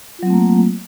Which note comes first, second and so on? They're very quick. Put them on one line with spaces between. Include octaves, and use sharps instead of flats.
F4 F#3 C4 A3 A#3